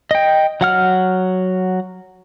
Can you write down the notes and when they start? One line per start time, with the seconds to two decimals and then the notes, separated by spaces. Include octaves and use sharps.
0.11 D#5 G5
0.61 F#3 F#5 F6